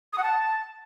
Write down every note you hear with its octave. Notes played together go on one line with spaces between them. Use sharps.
D#6
F#5
A5